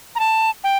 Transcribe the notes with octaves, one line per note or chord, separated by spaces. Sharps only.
A#5
A5
G5